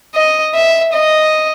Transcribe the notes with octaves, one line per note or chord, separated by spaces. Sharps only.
D#5
E5
D#5